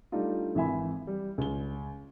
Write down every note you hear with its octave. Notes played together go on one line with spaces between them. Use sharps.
G3 A3 D4 D#4 F4
G#1 E3 E4 E5 G#5 B5
G3
C#2 G7